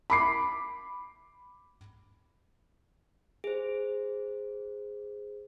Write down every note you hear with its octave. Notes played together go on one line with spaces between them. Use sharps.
B5 D6 C7
G#4 C5